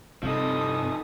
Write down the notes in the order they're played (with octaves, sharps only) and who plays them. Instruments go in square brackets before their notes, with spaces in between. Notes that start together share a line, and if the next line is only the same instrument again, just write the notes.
[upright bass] G2 [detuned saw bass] C3 [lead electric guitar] F3 D#4 [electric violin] A4 D#6